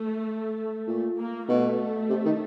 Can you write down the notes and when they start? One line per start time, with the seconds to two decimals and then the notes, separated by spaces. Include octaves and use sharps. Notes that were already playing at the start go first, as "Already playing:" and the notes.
Already playing: A3
0.87 A#2
1.18 A#3
1.48 B2 A3
2.10 C3
2.25 D#3